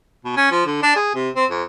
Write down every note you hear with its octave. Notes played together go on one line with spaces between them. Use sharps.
B2
C#4
F3
D3
D4
G#4
C3
C4
F2